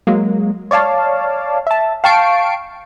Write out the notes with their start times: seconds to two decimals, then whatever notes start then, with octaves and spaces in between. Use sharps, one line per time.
0.07 F#3 G#3 A#3
0.71 C#5 D5 F5 A5
1.67 E5 A5
2.04 F5 G5 A5 C#6 C7 D7